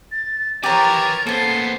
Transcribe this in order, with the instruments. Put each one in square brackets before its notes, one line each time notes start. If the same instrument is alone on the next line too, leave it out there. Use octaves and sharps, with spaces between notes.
[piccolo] A6
[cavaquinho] G4 A#5 [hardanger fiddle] A#4 C#5 [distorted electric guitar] B4 G#5 [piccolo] A6
[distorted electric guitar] A#3 B3 [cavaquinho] A4 G#5 [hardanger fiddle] C5 C6